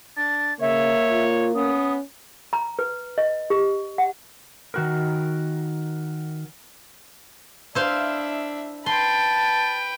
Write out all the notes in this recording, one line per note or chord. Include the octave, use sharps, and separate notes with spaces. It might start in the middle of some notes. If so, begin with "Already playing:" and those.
D4 A6
C#3 A#3 C#5 E5
F4
B3 C#4 D#6
A#5
B4
D#5
G4
F#5
D#3 F#4 A#4
D4 E4 C5 E5 F5
B4 G5 A5 C6